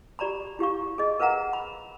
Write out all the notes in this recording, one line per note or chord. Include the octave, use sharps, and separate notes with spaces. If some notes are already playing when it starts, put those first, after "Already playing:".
G4 D5 A#5 B5
E4 G4 F5 C#6
G#4 D#5
A#4 B4 F5 F#5 A#5
B5